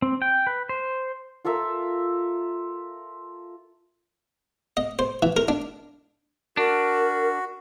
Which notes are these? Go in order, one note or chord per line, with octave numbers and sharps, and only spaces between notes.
C4
G5
B4
C5
F4 A4 A#4 E5
D#5
C5
E3
A#4
D4
D4 F#4 A#4